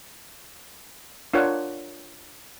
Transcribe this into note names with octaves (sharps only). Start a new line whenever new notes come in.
D4 F4 A#4 C#5 F#5